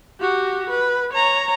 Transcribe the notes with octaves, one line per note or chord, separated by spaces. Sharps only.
F#4 G4
B4
C#5 A#5